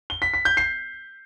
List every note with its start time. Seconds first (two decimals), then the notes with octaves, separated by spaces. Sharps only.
0.10 G7
0.22 B6
0.34 B6
0.45 G6
0.57 C7